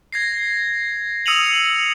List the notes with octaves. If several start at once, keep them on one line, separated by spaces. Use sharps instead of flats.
G#6 A#6 C7
D#6 E6 C#7 D#7 F7 F#7